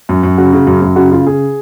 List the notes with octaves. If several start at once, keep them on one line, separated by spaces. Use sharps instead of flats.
F#2
F#2
C#3 F#4
C#3
F#2
F#2
C#3 F#4
C#3 F4
C#3 G#4